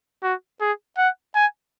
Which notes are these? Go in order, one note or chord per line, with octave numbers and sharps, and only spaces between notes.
F#4
G#4
F#5
G#5